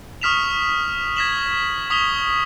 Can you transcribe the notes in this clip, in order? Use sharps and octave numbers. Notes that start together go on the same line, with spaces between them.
C#6 D#6 F6 B6 E7 F7
G#6 A#6 B6 E7 F#7
C#6 D#6 B6 F7 G7